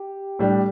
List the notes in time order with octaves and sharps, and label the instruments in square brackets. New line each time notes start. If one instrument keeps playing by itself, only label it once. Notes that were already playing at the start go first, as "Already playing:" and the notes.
Already playing: [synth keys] G4
[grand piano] A2 G3 D4